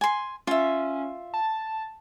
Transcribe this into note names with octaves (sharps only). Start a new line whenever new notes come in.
G#5 C6
C#4 F4 E5
A5